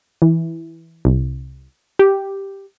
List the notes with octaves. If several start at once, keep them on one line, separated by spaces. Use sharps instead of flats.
E3
C2
G4